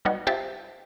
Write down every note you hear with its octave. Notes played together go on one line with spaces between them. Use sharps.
F#3 G3 B3 D#4 F#4
C4 F4 G4 E5 A5